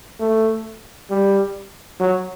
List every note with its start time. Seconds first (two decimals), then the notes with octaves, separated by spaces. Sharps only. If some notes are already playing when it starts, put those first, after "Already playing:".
0.20 A3
1.10 G3
2.00 F#3